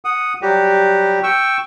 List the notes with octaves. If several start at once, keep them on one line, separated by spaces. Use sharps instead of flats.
F#5 D#6
F#3 G3 F#4 G4
G5 C#6 E6